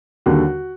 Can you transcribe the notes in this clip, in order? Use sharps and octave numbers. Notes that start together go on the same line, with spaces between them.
D#2 D3 G3 F#4